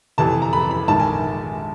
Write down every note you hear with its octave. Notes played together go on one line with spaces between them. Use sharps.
F1 F2 C3 E3 A5
A#5
B5
B5
A#1 G#2 D#3 A5
G#5